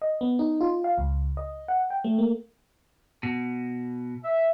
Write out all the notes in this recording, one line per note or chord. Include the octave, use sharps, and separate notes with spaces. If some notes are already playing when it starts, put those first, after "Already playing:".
D#5
B3
D#4
F4
F5
C#2
D#5
F#5
G5
A3
A#3
B2
E5